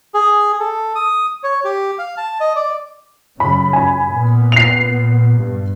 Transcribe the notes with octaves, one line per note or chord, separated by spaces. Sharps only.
G#4
A4
D#6
C#5
G4
F5
A5
D#5
D5
F#2 C#3 B5
F#2 G#5 B5
A#2 B3
C7 F7
G2